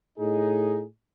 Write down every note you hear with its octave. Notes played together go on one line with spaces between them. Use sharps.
A2 D#4 G#4